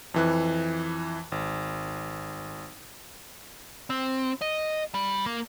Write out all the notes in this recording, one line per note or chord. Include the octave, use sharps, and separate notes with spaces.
F2 E3 F#6
G#1
C4
D#5
G3
A#3